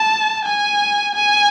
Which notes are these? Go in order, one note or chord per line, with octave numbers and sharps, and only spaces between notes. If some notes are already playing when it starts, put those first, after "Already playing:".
Already playing: A5
G#5
G#5